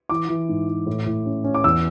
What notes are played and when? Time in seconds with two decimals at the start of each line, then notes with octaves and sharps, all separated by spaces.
0.09 E3 D6
0.29 E3
0.49 G#2
0.68 E3
0.86 A2
1.06 A2
1.26 C#4
1.44 C#4
1.54 D6
1.64 E2 E6